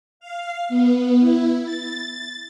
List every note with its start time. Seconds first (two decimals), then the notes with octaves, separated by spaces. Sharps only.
0.20 F5
0.69 B3
1.20 E4
1.64 A6